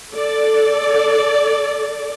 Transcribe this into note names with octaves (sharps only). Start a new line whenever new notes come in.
A4 D5